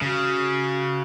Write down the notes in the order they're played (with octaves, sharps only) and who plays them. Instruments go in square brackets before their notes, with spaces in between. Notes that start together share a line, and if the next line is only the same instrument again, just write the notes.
[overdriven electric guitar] C#3 [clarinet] F#4